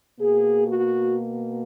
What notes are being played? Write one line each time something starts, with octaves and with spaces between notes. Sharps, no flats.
B2 A#3 G#4
F#4